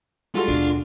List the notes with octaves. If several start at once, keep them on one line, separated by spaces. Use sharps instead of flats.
G3 G#3 F4 F#4 A4
D#2 B2 D4